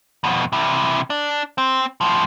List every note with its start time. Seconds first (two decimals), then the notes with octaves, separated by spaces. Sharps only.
0.24 F2 B2
0.52 C3 E3
1.10 D4
1.58 C4
2.01 A2 F3